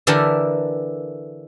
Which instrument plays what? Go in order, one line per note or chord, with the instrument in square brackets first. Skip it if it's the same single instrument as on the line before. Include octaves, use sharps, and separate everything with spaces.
[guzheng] D3 E3 E4 G4 A4 A#4